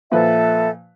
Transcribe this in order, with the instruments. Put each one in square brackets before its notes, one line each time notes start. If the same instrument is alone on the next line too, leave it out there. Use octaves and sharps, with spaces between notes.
[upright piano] A#2 F3 B4 [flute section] A4 E5